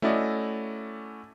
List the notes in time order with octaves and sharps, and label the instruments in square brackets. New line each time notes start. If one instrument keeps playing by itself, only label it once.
[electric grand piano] A3 C#4 E4 F#4 D5 D#5